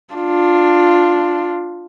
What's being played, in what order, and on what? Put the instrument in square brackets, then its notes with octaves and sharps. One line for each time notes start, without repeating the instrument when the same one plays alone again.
[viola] D4 F4